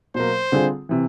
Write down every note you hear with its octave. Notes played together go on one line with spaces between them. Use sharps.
B2 F#3 A#3 C5
D3 G3 C4 F4 G#4
C3 E3